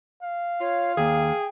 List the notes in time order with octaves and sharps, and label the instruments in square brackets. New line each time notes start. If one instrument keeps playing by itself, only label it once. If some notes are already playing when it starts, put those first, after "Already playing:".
[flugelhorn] F5
[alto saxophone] F4 [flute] C#5
[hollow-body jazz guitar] D#2 [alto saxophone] G#4 [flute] G5